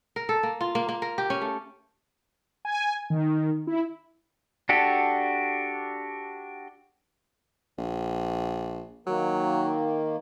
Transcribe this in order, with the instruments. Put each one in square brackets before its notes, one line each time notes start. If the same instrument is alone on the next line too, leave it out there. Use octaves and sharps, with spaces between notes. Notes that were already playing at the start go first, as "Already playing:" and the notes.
[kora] A#4
A4
A#3
F4
A#3
A#3
A#4
G4
C#4
A3
[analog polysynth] G#5
D#3
E4
[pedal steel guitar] D4 F#4 G4 A4
[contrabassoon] A#1
[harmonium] D#3 A#3 [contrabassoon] F#3